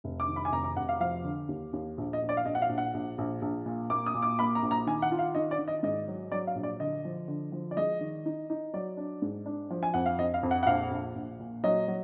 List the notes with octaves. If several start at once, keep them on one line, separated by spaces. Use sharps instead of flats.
F1
D6
D#3
B5
G#5
F1 A#5
A#5
F1 F#5
F5
F3 F5
D3
D#2
D#2
A#1
D#5
A#1
D5
F5
A#1 D#5
F#5
F5
A#1
F#5
A#1
A#1
A#1
A#2
A#3 D6
D#6
A#2
D6
A#3 B5
A#5
A#1
A#5
D#3 G#5
F#5
F4
F5
D#3 D#5
D5
D#3
D#5
G#2 D#5
F#3
F#3 D5
F5
A#1
D5
D3 D#5
F3
D3
F3
D5
G#3 D#5
D#3
D#4
D#4
F#3 D5
D4
G#2
D4
F3
G#5
F2 F#5
F5
F2 D#5
F5
F2
F#5
F#5
A#1 F5
A#1
A#1
A#2
F#3 D#5
F#3